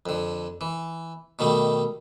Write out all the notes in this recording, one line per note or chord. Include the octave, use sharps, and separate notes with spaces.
F2 D3
E3
B2 D#3 G3 A3